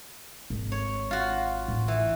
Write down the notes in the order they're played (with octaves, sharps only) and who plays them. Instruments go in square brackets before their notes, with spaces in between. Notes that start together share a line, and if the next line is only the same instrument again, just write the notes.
[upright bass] G#1
[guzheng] C#5
F4 F#4
[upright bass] A1
[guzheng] E3